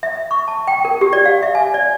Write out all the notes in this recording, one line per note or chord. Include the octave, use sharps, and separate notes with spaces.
E5
C#6
A5
G5
A#4
G4
D5
F5
E5
G#5
D5